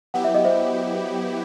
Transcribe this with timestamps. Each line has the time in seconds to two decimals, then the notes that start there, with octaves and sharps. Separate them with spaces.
0.14 F#3 B3 E4 G4 F#5
0.24 E5
0.35 D#5
0.45 C5 E5